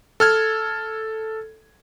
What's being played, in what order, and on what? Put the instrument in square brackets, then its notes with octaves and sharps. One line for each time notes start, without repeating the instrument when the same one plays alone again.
[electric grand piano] A4 F6 G#6